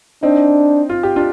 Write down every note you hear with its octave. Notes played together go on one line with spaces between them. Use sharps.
C4 D4 D#4
F4
G4
D4 F4